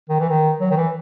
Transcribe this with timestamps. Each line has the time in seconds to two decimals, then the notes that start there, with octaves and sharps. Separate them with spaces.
0.09 D#3
0.19 E3
0.29 D#3
0.60 F#3
0.70 D#3
0.76 E3